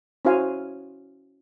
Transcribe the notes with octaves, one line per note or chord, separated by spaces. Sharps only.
C#4 E4 F#4 C5 F5 G#5